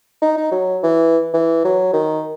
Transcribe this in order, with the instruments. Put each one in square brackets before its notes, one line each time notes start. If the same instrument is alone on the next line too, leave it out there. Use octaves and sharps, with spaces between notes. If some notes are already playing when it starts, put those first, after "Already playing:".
[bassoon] D#4
D#4
F#3
E3
E3
F#3
D#3